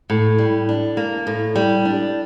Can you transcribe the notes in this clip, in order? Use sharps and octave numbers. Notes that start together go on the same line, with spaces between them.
A2
G3
D4
A#3
A2
G3
D4